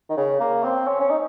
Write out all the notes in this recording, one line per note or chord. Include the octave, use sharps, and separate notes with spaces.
D#3
C#3
A#3
C4
C#4
C#4
D#4